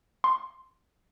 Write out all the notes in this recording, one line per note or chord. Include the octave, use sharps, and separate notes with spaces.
C6